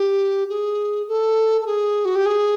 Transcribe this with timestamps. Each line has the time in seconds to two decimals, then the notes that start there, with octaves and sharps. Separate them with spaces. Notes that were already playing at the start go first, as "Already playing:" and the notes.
Already playing: G4
0.49 G#4
1.08 A4
1.61 A4
1.66 G#4
2.05 F#4
2.15 G4
2.26 G#4